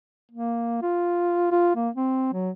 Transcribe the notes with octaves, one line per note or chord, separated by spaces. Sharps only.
A#3
F4
F4
A#3
C4
F#3